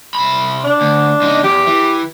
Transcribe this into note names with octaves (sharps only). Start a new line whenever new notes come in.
C3 B5
D4
D2
C#2 D#4
E2 G4
E3